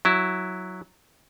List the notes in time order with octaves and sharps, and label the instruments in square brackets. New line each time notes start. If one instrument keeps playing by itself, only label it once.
[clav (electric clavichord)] F#3 E4